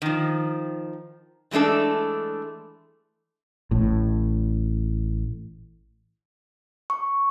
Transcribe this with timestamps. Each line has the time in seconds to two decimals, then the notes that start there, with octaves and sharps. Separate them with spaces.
0.02 D#3 F3
1.51 E3 G#3 A3 D4 A4
3.71 A1 A2
6.90 C#6